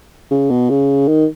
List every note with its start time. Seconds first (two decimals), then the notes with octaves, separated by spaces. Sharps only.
0.31 C#3
0.50 B2
0.70 C#3
1.08 D#3